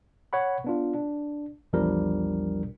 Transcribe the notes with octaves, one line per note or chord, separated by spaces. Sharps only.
C#5 F#5 B5
B3 D4 F4
D4
A#1 E2 F3 G3 D4 A#4